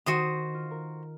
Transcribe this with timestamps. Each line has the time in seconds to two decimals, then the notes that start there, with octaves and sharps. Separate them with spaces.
0.06 D#3 F#4 C5 D#6
0.54 F4
0.71 A#4